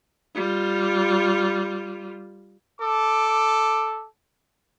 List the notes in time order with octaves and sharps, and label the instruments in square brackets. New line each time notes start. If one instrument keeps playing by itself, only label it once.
[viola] G3 F4
[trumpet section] A4 D6